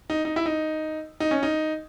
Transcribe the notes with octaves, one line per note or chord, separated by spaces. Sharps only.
D#4
D#4
E4
D#4
D#4
C#4
D#4